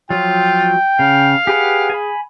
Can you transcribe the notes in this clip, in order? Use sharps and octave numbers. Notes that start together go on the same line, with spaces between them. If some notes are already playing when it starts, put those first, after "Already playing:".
F3 F#3 F4 G5
C#3 F5
G4 G#4 B4 F#5
G#5 B5